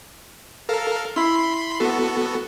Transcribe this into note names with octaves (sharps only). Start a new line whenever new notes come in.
A4 A#4 F5
E4 B5 C6
B3 F#4 A4